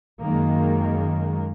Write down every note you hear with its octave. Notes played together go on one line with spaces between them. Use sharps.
F#2 D#3 G#3 A#3